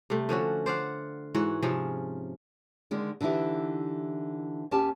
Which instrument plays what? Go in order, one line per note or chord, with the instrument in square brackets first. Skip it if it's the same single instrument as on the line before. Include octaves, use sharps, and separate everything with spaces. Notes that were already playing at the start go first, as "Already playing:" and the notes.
[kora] C3 G3 A3
D3 F3 C#4 F#4
C5 D5 F5 F#5
G#2 E3 F#4 C#5
C3 F3 C#4 G#4
[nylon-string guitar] D3 D#3 G#3
D3 E3 D#4 E4 G4
D#2 C#4 G4 G#5 A5